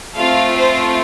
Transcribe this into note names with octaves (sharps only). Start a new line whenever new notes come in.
A3 C4 F4 F5
C5